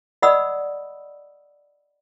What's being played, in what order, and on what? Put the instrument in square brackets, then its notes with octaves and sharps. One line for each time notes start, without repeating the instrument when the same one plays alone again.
[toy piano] D5 D#5 F#5 B5 D#6 E6